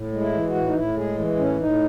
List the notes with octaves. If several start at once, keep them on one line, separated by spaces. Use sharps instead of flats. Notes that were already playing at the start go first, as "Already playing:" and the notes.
Already playing: A2
G#3
E4
E3
F#4
A2
D#4
A2 E4
G#3 G#4
E3
A2 C#4
A2 D#4